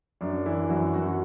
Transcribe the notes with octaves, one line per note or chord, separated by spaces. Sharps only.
F#2 D4
E3 E4
F#2 F#4
F#2 F#4
F#4